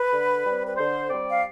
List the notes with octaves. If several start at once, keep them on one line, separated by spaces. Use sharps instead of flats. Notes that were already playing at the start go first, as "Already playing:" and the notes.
Already playing: B4
D3
G3 C4
B4
D3 C5
G3 C4 D5
F5